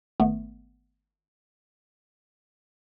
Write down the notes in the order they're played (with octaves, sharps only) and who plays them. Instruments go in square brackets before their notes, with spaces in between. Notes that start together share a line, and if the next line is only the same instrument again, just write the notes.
[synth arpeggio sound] G#1 A3 B3